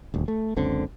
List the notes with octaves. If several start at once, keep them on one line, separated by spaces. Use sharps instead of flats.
D#1 D2
A3
F#1 C#2 D3 C4